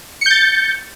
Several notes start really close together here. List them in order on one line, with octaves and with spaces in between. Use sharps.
C#7 G6 A6